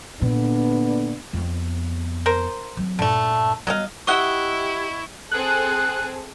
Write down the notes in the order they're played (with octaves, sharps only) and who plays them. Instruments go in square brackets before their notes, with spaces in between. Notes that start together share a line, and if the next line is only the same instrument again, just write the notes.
[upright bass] A#2 [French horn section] D3 B3 D4
[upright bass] F2 B3
[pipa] A#4 C5
[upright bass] F#3 C4
[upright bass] G2 A#2 [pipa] D3 A3
[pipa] F#3 D#5 F5 [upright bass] G3 B3
[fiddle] E4 [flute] G4 [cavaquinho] D#5 E5 F#5 [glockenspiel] C#6 G7
[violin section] C4 G#4 A4 [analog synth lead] F#6